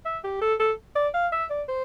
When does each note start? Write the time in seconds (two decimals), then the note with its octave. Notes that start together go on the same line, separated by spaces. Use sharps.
0.06 E5
0.24 G4
0.41 A4
0.60 A4
0.96 D5
1.14 F5
1.32 E5
1.50 D5
1.68 C5